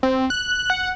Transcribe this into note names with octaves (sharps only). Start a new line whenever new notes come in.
C4
F#6
F#5